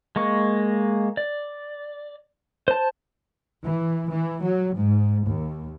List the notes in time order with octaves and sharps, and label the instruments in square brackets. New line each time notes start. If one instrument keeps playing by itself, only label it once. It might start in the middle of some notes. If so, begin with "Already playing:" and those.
[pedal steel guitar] G#3 A#3 C#6
D5
C5 A5
[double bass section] E3
E3
F#3
G#2
D#2